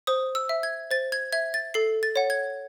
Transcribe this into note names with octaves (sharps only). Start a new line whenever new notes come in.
C5 D#6
E6
E5
G#6
C5 A6
G#6
E5 G#6
A6
A4 C7
A6
C#5 F#5
G#6